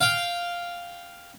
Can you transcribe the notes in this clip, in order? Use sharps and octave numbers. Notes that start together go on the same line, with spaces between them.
F5 G5